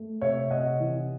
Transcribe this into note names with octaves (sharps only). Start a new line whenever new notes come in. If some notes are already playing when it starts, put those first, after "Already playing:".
Already playing: A3
C3 C#5 E5
C3 D#5 F#5
E3